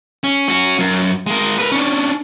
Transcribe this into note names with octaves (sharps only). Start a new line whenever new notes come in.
C#4
C#4 F#4
F#2
G#3 A#4
A#4 B4
C#4 D4